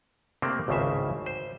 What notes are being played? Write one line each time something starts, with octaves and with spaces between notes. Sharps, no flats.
C3 A3 A#3 C4 D4
G#1 C#2 A2 C#3 C5 E5
C5